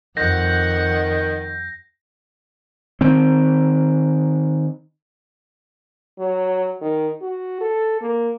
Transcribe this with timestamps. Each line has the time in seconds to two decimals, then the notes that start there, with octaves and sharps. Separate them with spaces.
0.17 F2 D#3 F#5 G6 A#6
3.01 D#3 C4
6.19 F#3
6.81 D#3
7.22 F#4
7.61 A4
8.01 A#3